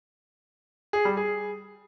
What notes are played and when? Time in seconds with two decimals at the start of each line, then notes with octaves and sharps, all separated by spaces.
0.93 G#4
1.05 G3
1.17 G#4